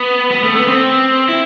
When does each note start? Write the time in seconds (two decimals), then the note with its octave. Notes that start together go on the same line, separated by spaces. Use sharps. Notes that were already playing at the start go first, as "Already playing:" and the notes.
Already playing: B3
0.31 B3
0.44 A3
0.56 B3
0.68 C4
1.29 E4